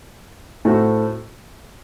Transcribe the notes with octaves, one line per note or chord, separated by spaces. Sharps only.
A2 A3 C4 F#4